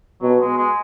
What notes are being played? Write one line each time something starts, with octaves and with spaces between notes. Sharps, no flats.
B2 F#3
G#3
G#3